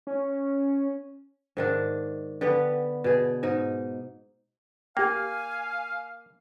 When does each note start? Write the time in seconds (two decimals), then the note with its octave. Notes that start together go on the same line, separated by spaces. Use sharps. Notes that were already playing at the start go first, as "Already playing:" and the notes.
0.07 C#4
1.57 G#2 D#3 D4
2.41 D3 B3 G4 B4
3.04 B2 G#4
3.43 G#2 D#4
4.97 A#3 G4 F5 G5 G#5